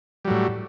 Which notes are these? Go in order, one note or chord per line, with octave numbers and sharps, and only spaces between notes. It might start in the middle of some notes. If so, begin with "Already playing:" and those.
A2 F#3 G3